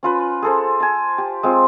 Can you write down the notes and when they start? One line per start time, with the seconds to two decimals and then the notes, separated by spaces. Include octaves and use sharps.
0.03 C#4 F4 B4
0.42 G#4 A4 C5
0.80 G#5 A5
1.18 G4
1.43 G#3 C4 F4